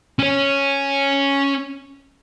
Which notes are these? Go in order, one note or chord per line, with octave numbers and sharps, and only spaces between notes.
C#4 C#5